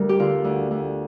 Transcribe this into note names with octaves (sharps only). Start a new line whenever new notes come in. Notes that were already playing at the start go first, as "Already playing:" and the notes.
Already playing: D2 G3 A#4
G4
D3 F4
D2
D2